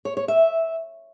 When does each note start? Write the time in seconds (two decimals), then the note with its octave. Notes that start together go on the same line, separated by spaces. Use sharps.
0.05 C#5
0.17 C#5
0.28 E5